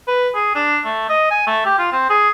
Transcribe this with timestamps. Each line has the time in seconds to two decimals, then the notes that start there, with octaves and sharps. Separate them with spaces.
0.07 B4
0.34 G#4
0.55 D4
0.85 A3
1.10 D#5
1.31 G#5
1.47 A3
1.66 G4
1.79 F4
1.92 C4
2.10 G#4